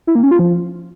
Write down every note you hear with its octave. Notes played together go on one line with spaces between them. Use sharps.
E4
A#3
C#4
F4
F3